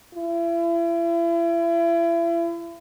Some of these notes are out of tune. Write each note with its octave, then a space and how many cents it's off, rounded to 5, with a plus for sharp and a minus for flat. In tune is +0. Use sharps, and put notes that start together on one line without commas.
E4 +35